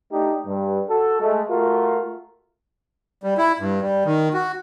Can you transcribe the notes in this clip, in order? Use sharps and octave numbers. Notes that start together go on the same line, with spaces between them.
A3 D4 D#4 G4
G2
F#4 A4
G#3 A3
A3 F4 F#4 A#4
G3
E4
G2
G3
D#3
F#4